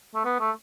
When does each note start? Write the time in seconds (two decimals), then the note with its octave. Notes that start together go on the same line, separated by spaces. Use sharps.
0.15 A3
0.25 B3
0.40 A3